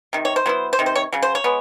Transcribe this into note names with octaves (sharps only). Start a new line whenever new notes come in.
C3 D#3
C#5
C5
F#3 B3 E4
C5
C3 D#3
C5
C#5
C#3 F#3
C5
C#5
G#3 B3